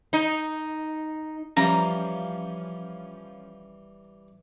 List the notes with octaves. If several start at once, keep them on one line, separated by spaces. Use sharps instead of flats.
D#4
E3 F3 G3 C#4 F5 A#5